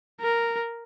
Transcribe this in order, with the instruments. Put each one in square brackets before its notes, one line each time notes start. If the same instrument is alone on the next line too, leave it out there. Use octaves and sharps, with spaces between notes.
[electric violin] A#4